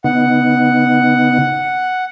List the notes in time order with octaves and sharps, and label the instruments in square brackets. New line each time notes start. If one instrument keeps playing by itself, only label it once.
[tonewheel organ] C#3 B3 D#4 [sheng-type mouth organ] F#5